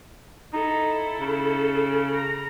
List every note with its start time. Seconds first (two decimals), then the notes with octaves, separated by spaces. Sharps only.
0.53 D#4 E4 A4
1.20 C#3
2.13 A#5